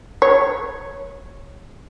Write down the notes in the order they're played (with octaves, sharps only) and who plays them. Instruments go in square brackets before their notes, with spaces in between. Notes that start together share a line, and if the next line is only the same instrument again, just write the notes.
[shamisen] C#5